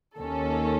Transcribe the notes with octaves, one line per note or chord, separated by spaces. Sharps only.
D#2 D#3 A#3 C#4 A4